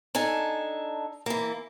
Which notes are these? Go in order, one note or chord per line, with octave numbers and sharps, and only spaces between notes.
D4 D#4 A4 G#5
E3 A#3